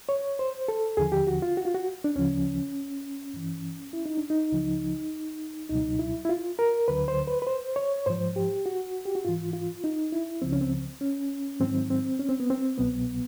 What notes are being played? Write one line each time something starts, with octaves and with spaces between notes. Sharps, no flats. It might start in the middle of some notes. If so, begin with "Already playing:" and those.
C#5
C5
A4
D#2 D3 F3 G#4
G4
F#4
F4
F#4
F4
F#4
D4
D2 C#3 F3 C#4
G2 E3
E4
D#4
D4
D#4
C#2 C#3 F3
C#2 B2 F#3 D#4
E4
E4
F4
A#4
D2 D3 F#3 B4
C5
B4
B4
C5
C#5
G#2 F3 C5
G4
F#4
G4
F#4
G#2 E3 F4
F4
D#4
E4
C#2 C#3 F3 C4
C#4
C4
C#4
G#2 D#3 F#3 C4
C4
C#4
C4
B3
C4
C2 B2 F#3 B3